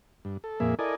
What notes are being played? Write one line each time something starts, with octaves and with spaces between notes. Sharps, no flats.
G2
A4
F2 A#2 A#3 G#4 E5
E4 A4 A#4 D5 D#5 G#5